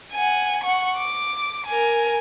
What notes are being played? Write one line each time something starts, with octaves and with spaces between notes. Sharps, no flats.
F#5 G#5
F#5 C#6
D6
A#4 G#5